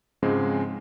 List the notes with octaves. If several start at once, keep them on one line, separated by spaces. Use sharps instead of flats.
G#2 C#3 F3 G#3 C4 C#4